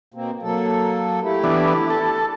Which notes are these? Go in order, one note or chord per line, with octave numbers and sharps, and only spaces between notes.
B2 A#3 C4
F#3 A#3 A4
A3 E4 G4
E3 B3 D4
A4